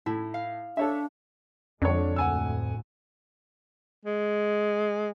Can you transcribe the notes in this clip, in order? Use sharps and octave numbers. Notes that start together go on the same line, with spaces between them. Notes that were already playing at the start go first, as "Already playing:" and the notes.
A2 E4
F5
D4 A4 C#5 E5
F2 D3 F3 G#3 D4 C#5
D2 A2 F#5 G#5 E6
G#3